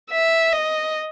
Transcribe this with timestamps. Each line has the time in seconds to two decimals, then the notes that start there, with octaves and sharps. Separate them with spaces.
0.11 E5
0.52 D#5